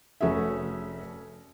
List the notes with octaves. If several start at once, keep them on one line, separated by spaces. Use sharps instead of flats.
F1 A3 C#4 F#4 G#4 E5